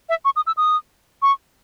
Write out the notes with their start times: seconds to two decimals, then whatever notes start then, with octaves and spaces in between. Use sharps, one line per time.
0.09 E5
0.25 C#6
0.36 D#6
0.47 E6
0.57 D#6
1.22 C#6